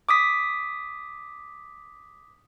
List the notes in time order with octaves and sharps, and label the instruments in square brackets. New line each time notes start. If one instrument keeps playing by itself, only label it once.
[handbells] D6 D#6 B6